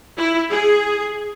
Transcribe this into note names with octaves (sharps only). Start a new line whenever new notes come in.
E4
G#4